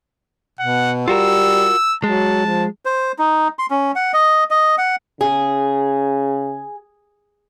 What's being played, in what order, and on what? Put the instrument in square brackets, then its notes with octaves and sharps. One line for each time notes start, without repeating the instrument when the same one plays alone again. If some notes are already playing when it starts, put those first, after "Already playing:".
[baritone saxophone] B2 [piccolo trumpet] F#5
[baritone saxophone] G3 [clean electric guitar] F4 F#4 A#4 [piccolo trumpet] E6
[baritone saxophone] F#3 [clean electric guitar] G#3 [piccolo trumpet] A5
[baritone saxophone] F3
[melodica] C5
D#4
C6
C#4
F#5
D#5
D#5
F#5
[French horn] C#3 [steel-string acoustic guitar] G#4